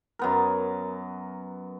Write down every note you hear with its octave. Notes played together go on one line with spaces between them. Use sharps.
F#2 B3 A#4